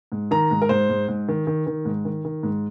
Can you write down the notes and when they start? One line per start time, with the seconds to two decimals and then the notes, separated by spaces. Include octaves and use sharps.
0.12 G#2
0.31 D#3 A#5
0.51 G#2
0.62 A#4
0.69 G#2 C5
0.89 G#2
1.08 G#2
1.28 D#3
1.47 D#3
1.66 D#3
1.85 G#2
2.05 D#3
2.25 D#3
2.43 G#2